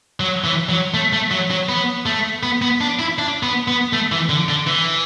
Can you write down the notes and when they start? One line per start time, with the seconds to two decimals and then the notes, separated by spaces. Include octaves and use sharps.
0.20 F#3
0.44 E3
0.69 F#3
0.94 A3
1.13 A3
1.31 F#3
1.50 F#3
1.69 B3
2.06 A3
2.43 B3
2.62 B3
2.81 D4
2.99 E4
3.18 D4
3.43 B3
3.68 B3
3.93 A3
4.12 E3
4.29 D3
4.48 D3
4.67 E3